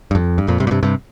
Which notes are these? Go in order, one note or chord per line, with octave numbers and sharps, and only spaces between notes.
G2
F2
G2
F2 A#2
G2 C3
A#2
G2 C3
G2 C3